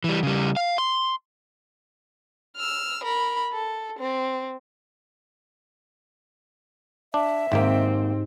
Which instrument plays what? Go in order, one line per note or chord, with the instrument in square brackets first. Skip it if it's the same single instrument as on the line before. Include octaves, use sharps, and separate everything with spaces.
[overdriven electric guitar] E3 G3
C#3 G3
F5
C6
[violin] E6 F6
A#4 B5
A4
C4
[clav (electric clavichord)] D4 [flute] E5
[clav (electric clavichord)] G#1 A#3 [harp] G#2 G4 [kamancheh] C4